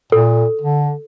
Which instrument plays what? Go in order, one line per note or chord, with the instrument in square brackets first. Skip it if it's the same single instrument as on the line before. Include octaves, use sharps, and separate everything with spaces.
[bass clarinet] A#2 [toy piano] A4
[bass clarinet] D3